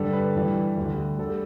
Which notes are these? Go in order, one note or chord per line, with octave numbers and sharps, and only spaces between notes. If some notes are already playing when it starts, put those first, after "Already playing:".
Already playing: G2 D3 G3 A4
B4
G2 E3 G3
D2 D3 G3
D3 G3 A4
G4